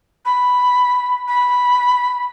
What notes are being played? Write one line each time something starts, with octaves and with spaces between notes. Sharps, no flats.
B5
B5